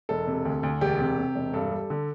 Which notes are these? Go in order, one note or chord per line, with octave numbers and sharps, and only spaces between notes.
E1 A4
C3
D2
D2
E1 G4
C3
C3
E1
G2 A4
G3
D3